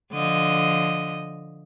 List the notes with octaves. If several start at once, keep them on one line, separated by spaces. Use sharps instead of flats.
D3 F3 D#5